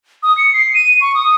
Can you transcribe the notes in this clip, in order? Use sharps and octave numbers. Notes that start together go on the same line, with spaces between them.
D#6
C#7
C7
D#7
C#6
D#6